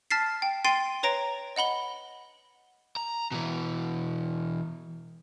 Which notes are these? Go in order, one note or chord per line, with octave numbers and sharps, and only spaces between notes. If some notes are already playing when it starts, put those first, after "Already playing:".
A5 F6 A6 B6 C7
G5
G5 C6 A6 C7 D#7
B4 C#5 A#5 A#6 D7
D#5 F#5 B5 G7
A#5
B2 E3